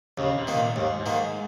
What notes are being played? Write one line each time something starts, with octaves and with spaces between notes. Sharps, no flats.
D#2 C#3
C3
D#3 A#3
A#2
D#2 G#2
G#2
D#3 A#3